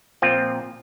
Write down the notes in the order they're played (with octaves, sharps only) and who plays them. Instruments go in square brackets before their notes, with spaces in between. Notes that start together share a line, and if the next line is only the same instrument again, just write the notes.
[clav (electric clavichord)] A#2 F3 C4 F4